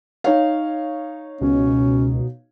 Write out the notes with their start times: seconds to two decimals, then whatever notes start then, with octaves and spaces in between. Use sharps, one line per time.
0.24 D#4 C#5 F5
1.41 C#2 B2 C#4